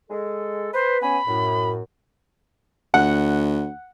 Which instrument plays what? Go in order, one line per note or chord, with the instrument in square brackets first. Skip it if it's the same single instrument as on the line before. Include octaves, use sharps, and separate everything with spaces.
[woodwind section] G#3 A4
[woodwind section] B4 [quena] C5
[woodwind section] B3 C#4 G#5 [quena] B5
[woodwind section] F#2 A2
[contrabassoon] D2 [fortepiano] F#5